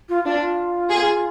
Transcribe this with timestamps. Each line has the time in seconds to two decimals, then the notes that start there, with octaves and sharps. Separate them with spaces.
0.09 F4
0.26 D4 F4
0.41 F4
0.89 G#4